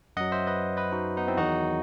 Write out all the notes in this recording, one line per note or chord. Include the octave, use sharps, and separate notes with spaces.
F#2 F#3 D#5 F#5
C5 E5
B4 D#5
B4 D#5
D#4 F#4
B3 D#4
C4 E4
E2 D#3 F#3 D#4 F#4